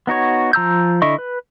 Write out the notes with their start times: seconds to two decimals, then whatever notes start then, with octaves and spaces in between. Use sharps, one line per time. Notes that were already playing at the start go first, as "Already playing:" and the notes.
0.07 B3 D#4 F#4 C#5
0.53 F3 A#5 E6 G6
1.02 D3 E4 D#5 C#6
1.18 B4